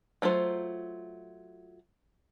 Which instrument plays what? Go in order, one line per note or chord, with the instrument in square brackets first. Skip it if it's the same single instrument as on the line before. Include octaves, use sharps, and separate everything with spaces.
[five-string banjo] F#3 A3 F4 C5